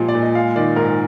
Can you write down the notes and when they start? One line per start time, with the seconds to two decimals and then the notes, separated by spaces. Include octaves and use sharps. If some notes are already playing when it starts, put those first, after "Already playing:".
Already playing: A#2 F3 G#3 G4
0.08 D5
0.15 A#2
0.22 D#5
0.35 G#3 F5
0.56 D#3 D5
0.76 G#2 A#4